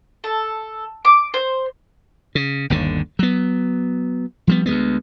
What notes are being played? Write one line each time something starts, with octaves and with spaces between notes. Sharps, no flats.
A4
D6
C5
C#3
G1 D#2 D3
F#3 B3
F3 G3 B3
D2 G3 G#3 B3